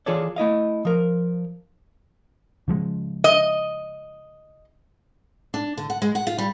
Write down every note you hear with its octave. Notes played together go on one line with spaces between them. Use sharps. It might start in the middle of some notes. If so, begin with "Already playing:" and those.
E3 F4 G#4 A4 C#5 D5
A3 E4 D#5 F5
F3 A#4
C#3 F3 G#3
D#5
D4
D3
F#5
G#3
F#5
F4
G3